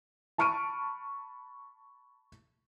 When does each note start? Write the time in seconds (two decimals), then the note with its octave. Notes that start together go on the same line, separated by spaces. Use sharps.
0.38 A5 B5 C#6 F6 D7 D#7